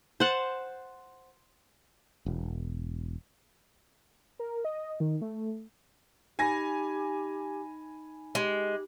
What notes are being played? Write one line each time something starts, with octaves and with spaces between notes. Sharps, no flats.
C5 F#5 A5
E1
A#4
D#5
D#3
A3
D#4 G4 G#5 B5 A#6
G#3 G4